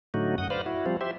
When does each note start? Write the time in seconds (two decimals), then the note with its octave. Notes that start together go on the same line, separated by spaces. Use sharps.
0.14 A2 D3 F#3 A3 D#4 F#4
0.38 F#2 F#5 D#6
0.50 B4 C5 D5 F5
0.66 E4 F#4
0.86 F3 G3 C4 F4
1.01 G4 C5 E5